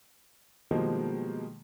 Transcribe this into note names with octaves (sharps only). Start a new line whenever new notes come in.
B2 D#3 F3 G3 G#3 A#3